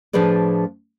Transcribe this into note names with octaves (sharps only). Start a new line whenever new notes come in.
A2 F3 D4 G#4 B4 D5